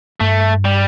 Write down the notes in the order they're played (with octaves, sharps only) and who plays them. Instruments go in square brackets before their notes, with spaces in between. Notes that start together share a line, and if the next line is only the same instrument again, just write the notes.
[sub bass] G2 [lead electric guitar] A3
[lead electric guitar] G3